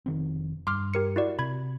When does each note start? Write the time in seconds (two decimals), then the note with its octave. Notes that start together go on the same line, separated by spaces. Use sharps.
0.06 F1 D#3 C4
0.67 G2 C6 D6 F6
0.94 G4 A#4 C#7
1.16 E4 F#4 D5
1.39 C3 B5 G#6